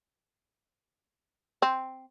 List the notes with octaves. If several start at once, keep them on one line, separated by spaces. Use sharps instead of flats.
C4